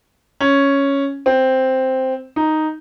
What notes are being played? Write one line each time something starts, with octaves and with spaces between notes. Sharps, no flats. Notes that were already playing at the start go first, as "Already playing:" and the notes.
C#4
C4
D#4